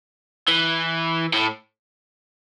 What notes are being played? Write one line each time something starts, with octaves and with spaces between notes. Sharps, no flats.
E3
A2